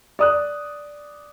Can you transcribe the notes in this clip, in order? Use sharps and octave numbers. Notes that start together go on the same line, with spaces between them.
D5 D#6 F#6